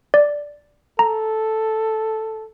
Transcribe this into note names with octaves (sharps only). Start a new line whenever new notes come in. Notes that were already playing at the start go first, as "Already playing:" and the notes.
D5
A4 A#5